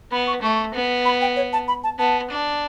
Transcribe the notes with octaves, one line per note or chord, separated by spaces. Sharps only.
B3 B5
C#6
A3 C#6
B3
B5
G5
C#5
A5
B5
A5
B3 A5
D4